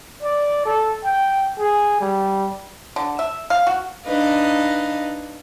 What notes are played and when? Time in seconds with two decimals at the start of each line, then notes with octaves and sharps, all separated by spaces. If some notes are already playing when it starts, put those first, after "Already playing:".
0.23 D5
0.65 A4
1.05 G5
1.59 G#4
2.01 G3
2.96 D3
3.19 E5
3.50 F5
3.67 F#4
4.05 D4 D#4 B4 D#5 F5